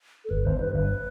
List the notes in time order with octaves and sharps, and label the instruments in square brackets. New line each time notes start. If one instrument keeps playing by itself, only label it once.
[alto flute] A4
[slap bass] G1 [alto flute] B4
[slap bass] G1 [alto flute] C5
[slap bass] G2 [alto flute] B4
[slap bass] G1 [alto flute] B4